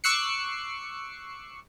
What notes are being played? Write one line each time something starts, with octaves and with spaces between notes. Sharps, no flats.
C#6 D6 E6 F#6 C7 C#7